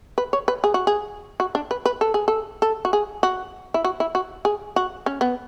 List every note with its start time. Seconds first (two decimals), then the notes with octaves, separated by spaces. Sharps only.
0.18 B4
0.33 C#5
0.48 B4
0.64 G#4
0.74 F#4
0.87 G#4
1.40 F#4
1.55 D4
1.71 B4
1.86 B4
2.01 A4
2.14 G#4
2.28 A4
2.62 A4
2.85 F#4
2.93 G#4
3.23 F#4
3.74 E4
3.84 F#4
4.00 E4
4.15 F#4
4.45 G#4
4.76 F#4
5.06 C#4
5.21 B3